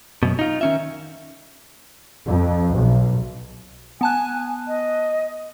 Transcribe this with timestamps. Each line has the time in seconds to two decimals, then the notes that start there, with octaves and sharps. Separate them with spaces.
0.23 F#2 B2
0.39 D#4 F4
0.61 D#3 C#4 E5
2.27 F2
2.74 B1
4.01 B3 G#5 A5 F#6
4.68 D#5